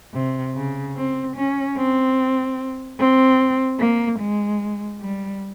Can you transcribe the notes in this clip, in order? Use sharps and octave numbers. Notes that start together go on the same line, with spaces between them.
C3
C#3
C4
C#4
C4
C4
A#3
G#3
G3